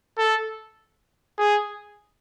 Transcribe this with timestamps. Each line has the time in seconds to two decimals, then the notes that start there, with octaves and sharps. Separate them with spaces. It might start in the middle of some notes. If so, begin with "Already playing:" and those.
0.18 A4
1.38 G#4